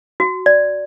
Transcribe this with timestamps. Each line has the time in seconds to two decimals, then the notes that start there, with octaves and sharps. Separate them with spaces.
0.20 F#4
0.46 D5